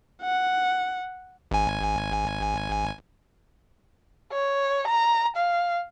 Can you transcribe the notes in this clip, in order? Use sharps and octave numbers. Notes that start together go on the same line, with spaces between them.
F#5
G#1 G#5
C#5
A#5
F5